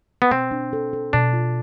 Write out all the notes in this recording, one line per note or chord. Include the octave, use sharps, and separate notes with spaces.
B3
B2 C4
D4
A4
A4
B2 D4
F4